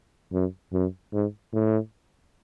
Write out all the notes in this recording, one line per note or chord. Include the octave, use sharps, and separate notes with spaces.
F#2
F#2
G#2
A2